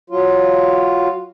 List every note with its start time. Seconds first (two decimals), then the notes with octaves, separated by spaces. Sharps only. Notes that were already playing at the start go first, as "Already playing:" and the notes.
0.10 F#3 F4